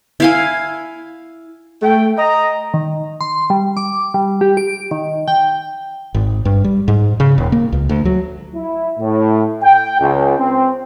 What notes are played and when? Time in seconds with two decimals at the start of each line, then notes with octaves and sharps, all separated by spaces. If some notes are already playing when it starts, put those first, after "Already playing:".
0.20 E4 F5 G#5
1.82 A3 G5
2.17 D#5 A#5
2.74 D#3
3.21 C6
3.50 G3
3.77 D6
4.14 G3
4.41 G4
4.57 D7
4.91 D#3
5.28 G5
6.14 G#1
6.45 G2
6.64 G3
6.88 G#2
7.20 C#3
7.38 D#1
7.52 A#3
7.72 C#2
7.89 D2
8.05 F#3
8.55 E4
8.99 A2
9.63 G5
9.99 C#2
10.38 C4